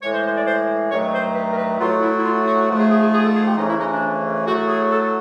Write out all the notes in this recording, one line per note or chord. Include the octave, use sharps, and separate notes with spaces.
A2 E3 G#3 C#5
C5
C5
D5
C5
G2 D#3 F#3 A3 C#5
C5
B4
A#4
B4
A2 F#3 A3 F4
E4
E4
F4
F#4
G#2 F3 A3
G#4
G#4
G#4
G#4
A4
G#4
G4
F2 C#3 E3 A3 D#4
E4
D#4
D4
A2 F#3 A3 F#4
G#4
A4